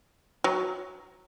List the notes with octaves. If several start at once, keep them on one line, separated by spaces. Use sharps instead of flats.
F#3